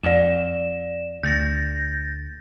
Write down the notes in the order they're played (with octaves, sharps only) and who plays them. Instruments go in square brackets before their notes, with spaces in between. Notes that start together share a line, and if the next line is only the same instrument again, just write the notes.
[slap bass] F2 [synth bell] D5 E7
[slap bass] D2 [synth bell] G6 A6 A#6